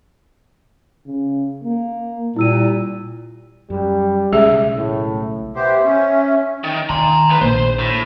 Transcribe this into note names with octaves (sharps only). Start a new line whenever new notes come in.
C#3
A#3
A#2 G3 E4 E6 D#7
F#2 G3
B1 C#3 G#3 G#4 E5
A2
B3 G4 C5 E5
C#4
D#3
D#3 A#5 C6
D2 B4
A#1 C5
A2